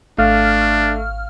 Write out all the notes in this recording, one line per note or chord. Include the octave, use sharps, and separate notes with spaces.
G#1 A3 D4 F5 F6